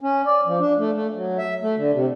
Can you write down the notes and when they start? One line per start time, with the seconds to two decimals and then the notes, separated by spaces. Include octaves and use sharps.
0.01 C#4
0.26 D5
0.46 F3
0.60 D4
0.78 A3
0.95 A3
1.15 F#3
1.38 E5
1.62 A3
1.76 D3
1.93 C3